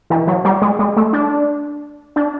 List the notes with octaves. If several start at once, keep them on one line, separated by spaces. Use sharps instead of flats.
E3
F#3
G3
G#3
G#3
A3
D4
D4